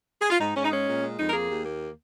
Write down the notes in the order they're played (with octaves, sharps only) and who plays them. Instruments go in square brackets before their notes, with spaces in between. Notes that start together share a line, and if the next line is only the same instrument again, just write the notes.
[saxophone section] G#4
F4
G#2 D#4
G#2 C#4
D#4
G#3 C#4
A#2
G#3
F2 D#4
A#4
A#3 G#4
D#2
A#3